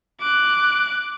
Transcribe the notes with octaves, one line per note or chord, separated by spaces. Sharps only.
D6 F#6